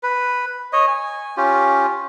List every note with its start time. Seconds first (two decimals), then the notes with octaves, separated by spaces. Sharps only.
0.03 B4
0.73 C#5 D#5
0.87 G#5
1.37 C#4 F4 G4